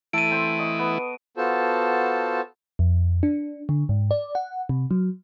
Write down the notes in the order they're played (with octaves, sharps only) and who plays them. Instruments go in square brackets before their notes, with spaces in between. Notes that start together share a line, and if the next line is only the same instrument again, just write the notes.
[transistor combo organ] E3 A3 E4 [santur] A4 [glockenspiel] D7 D#7
[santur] C4 C5 C6
D#5 C#6
B3
[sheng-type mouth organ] B3 F4 F#4 A4 C5 A5
[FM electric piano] F2
D4
D3
G#2
D5
F#5
C3
F#3